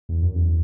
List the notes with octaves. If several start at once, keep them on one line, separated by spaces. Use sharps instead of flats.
E2
F#2
E2